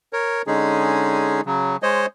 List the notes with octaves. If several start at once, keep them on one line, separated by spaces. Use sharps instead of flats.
A#4 C#5
D3 G#3 C#4 D#4 G#4
C#3 F#3
G#3 C5 C#5 D#5